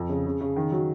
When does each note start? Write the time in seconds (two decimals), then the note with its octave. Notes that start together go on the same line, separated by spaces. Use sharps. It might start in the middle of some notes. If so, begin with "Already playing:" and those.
Already playing: F2
0.09 C#3
0.26 C#3
0.41 C#3
0.56 D#3
0.72 F#3